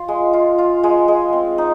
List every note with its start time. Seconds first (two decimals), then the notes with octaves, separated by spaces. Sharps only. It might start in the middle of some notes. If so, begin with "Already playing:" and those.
Already playing: F4
0.08 G#3
0.33 F4
0.58 F4
0.83 G#3
1.08 G#3
1.33 C4
1.58 D#4